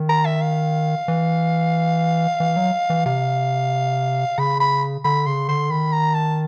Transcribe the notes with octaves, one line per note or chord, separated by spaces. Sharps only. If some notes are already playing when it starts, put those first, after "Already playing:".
Already playing: D#3
A#5
E5
F5
E3
E3
F#3
E3
C3 F5
C#3 B5
B5
D3 B5
C#3 C6
D3 C6
D#3 B5
A#5
A5